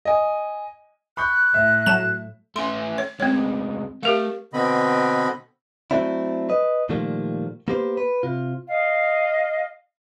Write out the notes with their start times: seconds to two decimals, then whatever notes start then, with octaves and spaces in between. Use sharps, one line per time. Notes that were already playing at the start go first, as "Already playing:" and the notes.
0.05 D#5 G#5
1.17 B5 C#6 F#6 G6
1.54 A2 E5
1.86 F#3 A3 E7
2.56 A3 C#4 C6
2.98 C#5
3.20 D2 G#3 C4 C#5
4.03 A3 G4 A#4 F5
4.53 B2 D3 B3 C4 D#5 B5
5.91 F#3 A3 C4 D4 E4
6.49 B4 D#5
6.89 A#2 D#3 F3 G3 A3 A#3
7.68 A#3 B3 G4 B4 C5
7.97 B4
8.23 C3 F4
8.68 D#5 F5